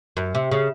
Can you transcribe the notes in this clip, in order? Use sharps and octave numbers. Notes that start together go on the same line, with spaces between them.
F#2
C3
C#3